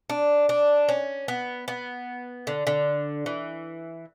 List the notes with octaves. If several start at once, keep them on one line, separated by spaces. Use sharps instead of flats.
D4
D4
C#4
B3
B3
D3
D3
E3